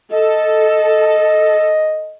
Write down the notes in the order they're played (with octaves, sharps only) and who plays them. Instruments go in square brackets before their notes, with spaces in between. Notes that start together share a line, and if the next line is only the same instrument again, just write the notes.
[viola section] A4 [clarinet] D#5